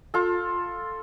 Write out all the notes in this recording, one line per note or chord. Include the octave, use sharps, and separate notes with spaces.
F4 A4